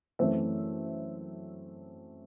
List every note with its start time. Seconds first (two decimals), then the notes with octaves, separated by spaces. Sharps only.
0.19 F#2 E3 A3 C4 C5 E5